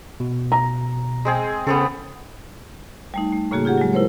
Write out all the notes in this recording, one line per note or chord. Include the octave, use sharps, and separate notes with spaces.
B2
A#5
G#3 C4 G#4
C#3 B3 C4 A4
G3 A3 D#4
A3
A2 C#3 A#3 F#4 G#4
F4 G4 G#4 F#5
F#3 G#3
E4 A#4 C5 C#5